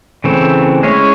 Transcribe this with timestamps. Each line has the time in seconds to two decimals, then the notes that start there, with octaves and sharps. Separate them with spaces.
0.24 C#3 E3 A3 C4
0.83 G#3 C#4 E4 G#4 C#5